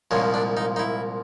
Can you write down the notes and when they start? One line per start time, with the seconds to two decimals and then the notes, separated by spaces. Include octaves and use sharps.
0.11 C2 A#2 F3 G#3 C#4
0.34 D4
0.57 D#4
0.76 D#4
0.79 E4